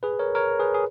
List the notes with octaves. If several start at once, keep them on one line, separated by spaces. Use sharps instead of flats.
G#4 B4
A#4 C#5
A#4 C#5
G#4 B4
G#4